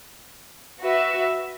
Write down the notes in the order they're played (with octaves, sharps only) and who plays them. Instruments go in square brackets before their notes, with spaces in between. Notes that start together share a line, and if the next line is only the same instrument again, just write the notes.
[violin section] F#4 B4 E5